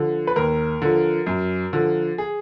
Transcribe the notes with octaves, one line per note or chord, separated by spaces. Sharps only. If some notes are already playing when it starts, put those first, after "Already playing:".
Already playing: D3 F3
B4
D#2 A#4
D3 F3
F#2
D3 F3
G#4